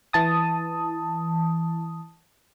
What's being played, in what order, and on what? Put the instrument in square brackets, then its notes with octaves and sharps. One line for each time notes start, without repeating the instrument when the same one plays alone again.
[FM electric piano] E3 A5 D#6